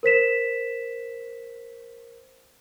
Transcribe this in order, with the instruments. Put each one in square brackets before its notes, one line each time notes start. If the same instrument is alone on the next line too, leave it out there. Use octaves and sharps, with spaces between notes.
[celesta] A#4 C5 B6 E7